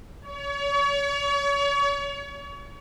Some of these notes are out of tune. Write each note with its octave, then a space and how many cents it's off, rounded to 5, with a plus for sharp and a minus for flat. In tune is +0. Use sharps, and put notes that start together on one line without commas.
C#5 +35